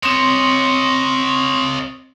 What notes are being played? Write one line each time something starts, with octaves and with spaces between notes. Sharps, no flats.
C4 C#5 D#5 C6